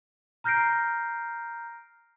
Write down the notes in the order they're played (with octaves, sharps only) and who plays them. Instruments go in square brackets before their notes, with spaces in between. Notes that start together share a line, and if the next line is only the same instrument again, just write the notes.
[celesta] A#5 F6 G6 A#6 C7 D7